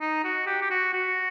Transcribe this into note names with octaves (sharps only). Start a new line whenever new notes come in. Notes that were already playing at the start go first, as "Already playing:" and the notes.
D#4
F#4
G4
G4
F#4
F#4